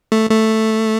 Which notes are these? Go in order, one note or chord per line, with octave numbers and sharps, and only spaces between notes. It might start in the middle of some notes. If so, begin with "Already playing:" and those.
A3
A3